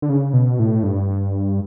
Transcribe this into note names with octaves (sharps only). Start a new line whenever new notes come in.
D3
C#3
B2
A2
G2